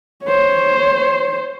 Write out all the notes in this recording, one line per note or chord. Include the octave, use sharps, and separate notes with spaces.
C5 C#5